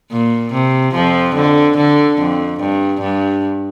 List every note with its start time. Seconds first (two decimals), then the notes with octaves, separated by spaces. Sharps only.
0.12 A#2
0.52 C3
0.94 F2 F3
1.35 D3
1.77 D3
2.18 F2
2.60 G2
3.01 G2